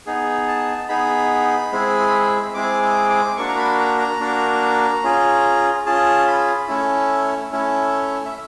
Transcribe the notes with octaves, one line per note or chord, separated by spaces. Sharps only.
B3 D#4 G#4
A5
B3 D#4 G#4 B5
G#3 C4 E4 G#4
G#3 C4 E4 G#4 D6
D6
D6
A#3 D4 F#4 C#6
A#5
B5
A#5
A#5
A#3 D4 F#4
C#4 F4 G#4
C#4 F4 G#4 A5
B5
A3 C#4 E4
A3 C#4 E4
E5